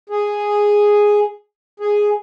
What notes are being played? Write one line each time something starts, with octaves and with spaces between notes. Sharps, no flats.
G#4
G#4